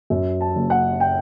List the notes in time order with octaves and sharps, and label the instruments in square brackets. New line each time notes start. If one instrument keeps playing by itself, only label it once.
[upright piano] F#2
A5
F#1
F#5
G5